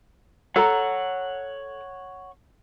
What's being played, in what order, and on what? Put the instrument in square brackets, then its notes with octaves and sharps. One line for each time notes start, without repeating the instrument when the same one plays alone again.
[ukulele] A4 A#5 [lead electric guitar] C#5 F#5